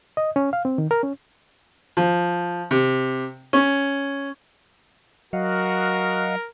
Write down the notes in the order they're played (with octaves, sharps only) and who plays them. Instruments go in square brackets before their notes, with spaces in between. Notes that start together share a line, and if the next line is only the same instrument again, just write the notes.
[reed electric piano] D#5
C#4
F5
C4
D#3
A#4
C#4
[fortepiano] F3
C3
C#4
[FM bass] F#3 [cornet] F#4 [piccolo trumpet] A#4 [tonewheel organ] D#5 F5 F#5